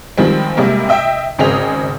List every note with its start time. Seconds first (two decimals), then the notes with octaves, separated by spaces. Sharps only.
0.18 D#3 F3 G3 G#3 C4
0.57 C3 G3 G#3 A#3
0.89 D#5 E5 G5
1.38 G#1 C#3 C4 G#4 D#5 F7